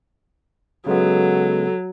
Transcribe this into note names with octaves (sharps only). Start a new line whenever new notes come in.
C#3 F#3 G#3 B3 A4